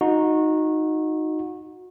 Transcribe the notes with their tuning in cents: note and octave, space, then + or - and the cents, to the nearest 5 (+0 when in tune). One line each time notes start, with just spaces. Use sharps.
D#4 +0 F#4 -25